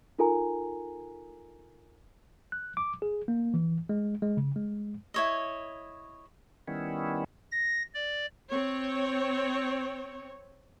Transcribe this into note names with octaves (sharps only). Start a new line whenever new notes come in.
D#4 F4 A4 A#4 G#5 A#5
F#6
D6
G#4
A#3
E3
G#3
G#3
C#3
G#3
E4 C#5 D#5
D#3 G3 B3 C#4 E4
A#6
D5
C4 C#5